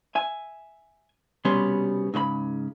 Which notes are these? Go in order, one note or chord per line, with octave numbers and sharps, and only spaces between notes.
E5 G#5
C2 B2 G3 B3 C#4 C6
G#2 C#3 C5 B5